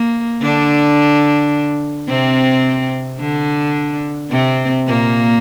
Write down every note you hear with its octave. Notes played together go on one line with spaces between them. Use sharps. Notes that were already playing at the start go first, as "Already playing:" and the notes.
Already playing: A#3
D3 D4
C3 C4
D3 D4
C3 C4
A#2 A#3